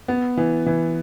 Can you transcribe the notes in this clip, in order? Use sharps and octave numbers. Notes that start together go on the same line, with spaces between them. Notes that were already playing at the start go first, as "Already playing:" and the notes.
B3
E3
E3